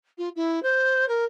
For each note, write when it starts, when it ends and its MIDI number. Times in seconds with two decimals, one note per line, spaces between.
0.18 0.29 65
0.36 0.62 64
0.62 1.05 72
1.08 1.24 70